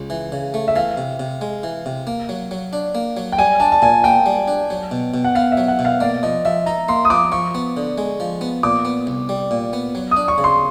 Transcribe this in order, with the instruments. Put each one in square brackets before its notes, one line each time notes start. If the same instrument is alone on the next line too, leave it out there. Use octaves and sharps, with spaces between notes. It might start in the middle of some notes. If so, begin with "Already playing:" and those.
Already playing: [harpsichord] C#2
E3
C#3
A3
[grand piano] E5
[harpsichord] E3 [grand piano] F5
[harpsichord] C3
C3
G#3
E3
C3
A#3
F#3
F#3
D4
A#3
F#3
[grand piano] G5
[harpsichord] G3 [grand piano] G#5
[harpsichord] D4 [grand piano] A5
[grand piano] A5
[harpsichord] A#2 [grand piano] G#5
[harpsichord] A#3 [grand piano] G5
[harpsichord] G3
D4
F#3
B2
B2
[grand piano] F#5
[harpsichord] B3 [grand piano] F5
[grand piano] E5
[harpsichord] F#3
[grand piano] F#5
[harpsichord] B2
[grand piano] F5
[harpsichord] A#3 [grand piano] D5
[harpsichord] F3 [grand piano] D#5
[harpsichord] F3 [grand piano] E5
[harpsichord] D#4 [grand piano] A#5
[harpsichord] A#3 [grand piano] C6
[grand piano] D#6
[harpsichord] F3 [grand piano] D6
[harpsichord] F3 [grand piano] C#6
[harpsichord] B3
D3
G#3
F3
B3
[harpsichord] A#2 [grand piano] D6
[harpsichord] B3
C2
G3
A#2
B3
F#3
[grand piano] D#6
[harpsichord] D4
[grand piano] C#6
[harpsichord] C#3
[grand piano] C6